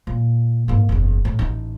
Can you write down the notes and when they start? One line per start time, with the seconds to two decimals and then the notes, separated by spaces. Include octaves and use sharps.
0.07 A#2
0.68 G#2 A#3
0.89 F#1 E2
1.25 A2
1.39 A1 D#4